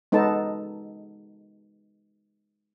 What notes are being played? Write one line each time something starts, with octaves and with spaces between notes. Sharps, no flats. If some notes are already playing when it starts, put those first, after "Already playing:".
G#3 B3 D#4 A4 A5